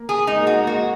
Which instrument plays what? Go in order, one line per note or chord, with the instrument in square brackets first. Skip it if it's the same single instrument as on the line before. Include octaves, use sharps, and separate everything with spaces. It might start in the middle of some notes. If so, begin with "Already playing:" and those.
Already playing: [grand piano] A#3
[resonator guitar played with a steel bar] G#4
[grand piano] G#3 [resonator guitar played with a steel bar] D#4
[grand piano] A#3
[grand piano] G#3 [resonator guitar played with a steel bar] F#4
[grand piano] A#3
[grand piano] G#3 [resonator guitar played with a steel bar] F#4